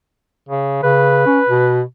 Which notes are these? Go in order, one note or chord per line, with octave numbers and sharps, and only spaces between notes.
C#3
C#3 B4
C#4
B2